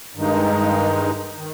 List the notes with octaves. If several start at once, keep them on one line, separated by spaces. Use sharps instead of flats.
G2 D#3 G#3 D#4
D#3